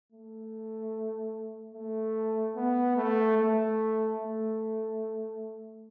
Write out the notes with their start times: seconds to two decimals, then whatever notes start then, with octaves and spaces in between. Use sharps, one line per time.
0.12 A3
1.74 A3
2.56 B3
2.96 A3
3.37 A3
4.18 A3